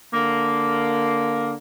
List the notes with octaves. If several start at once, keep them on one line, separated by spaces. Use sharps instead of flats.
D3 A#3